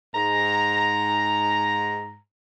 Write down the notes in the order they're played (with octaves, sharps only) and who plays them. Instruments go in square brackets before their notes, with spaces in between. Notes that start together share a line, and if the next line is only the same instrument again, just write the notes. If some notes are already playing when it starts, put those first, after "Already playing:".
[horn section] G#2 A#5